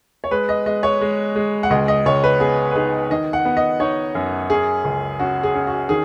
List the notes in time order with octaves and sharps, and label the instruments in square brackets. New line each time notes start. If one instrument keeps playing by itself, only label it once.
[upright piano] C#5
G#3 B4
D#5
G#3 D#5
C#5
G#3
G#3
F#5
C#2 D#5
D#5
C#2 C#5
B4
B3 G#4
B4
D#4 G#4
D#3 D#5
F#5
B3
D#5
D#4 C#5
F#2
C#4 G#4
C#2
C#4 F#4
G#4
C#4
F#4
D#3 G#4